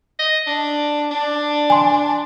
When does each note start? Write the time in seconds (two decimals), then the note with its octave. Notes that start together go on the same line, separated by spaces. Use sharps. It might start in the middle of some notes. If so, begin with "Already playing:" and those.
0.19 D#5
0.47 D4
1.11 D4
1.70 G#5 C6